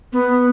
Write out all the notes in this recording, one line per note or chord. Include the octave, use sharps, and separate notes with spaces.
B3